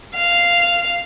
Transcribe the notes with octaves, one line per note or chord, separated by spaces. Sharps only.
F5